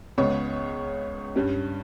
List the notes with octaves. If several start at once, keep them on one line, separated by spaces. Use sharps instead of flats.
C#2 C#3 G#3 B3 C#5
G2 G3 C#4